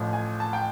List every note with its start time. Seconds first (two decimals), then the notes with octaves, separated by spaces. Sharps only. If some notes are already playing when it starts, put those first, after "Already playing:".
Already playing: A1 A2 F3
0.13 G#5
0.40 A5
0.53 G5